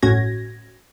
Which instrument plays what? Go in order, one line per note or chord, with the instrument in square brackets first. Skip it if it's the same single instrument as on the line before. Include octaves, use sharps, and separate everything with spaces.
[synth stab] G1 A2 C#4 F#4 G#6 A#6